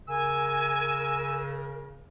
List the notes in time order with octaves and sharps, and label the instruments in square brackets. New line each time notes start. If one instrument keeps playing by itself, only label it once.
[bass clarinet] C#3 [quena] A#4 [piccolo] G#5 [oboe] E6